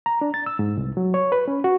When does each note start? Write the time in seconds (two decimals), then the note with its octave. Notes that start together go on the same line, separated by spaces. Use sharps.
0.06 A#5
0.21 D4
0.34 A6
0.46 E6
0.59 G#2
0.77 C2
0.97 F#3
1.14 C#5
1.32 B4
1.48 C#4
1.64 F#4